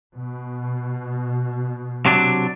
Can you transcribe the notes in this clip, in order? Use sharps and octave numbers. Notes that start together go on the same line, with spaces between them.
B2
C3 F#3 D4